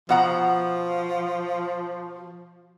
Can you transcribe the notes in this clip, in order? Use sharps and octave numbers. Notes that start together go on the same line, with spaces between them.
B2 F3 F#5 A#5